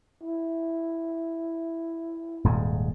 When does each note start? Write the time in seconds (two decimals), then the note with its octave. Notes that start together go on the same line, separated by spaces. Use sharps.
0.23 E4
2.44 D#1 G#2